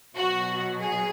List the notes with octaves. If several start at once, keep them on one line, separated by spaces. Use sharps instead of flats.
B2 F#3 F#4
G#4